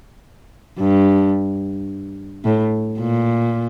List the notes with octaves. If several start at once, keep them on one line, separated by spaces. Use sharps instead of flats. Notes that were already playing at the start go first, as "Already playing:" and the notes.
G2
A2
A#2